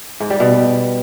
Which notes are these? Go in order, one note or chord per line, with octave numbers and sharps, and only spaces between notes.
G#2
G3
B2